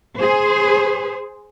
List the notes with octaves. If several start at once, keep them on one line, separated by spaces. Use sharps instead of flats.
G#4 C5